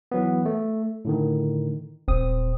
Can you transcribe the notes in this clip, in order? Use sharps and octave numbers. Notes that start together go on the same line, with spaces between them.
E3 F#3 B3
A3
A2 D3 D#3
D#1 C4 D#6